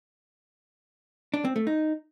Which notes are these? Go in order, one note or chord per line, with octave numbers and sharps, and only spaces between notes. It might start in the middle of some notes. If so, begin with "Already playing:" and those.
D4
C4
A3
D#4